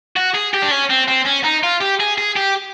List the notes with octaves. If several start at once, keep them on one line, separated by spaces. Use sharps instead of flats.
F#4
G#4
G4
D4
C#4
C4
C4
C#4
D#4
F4
G4
G#4
G#4
G4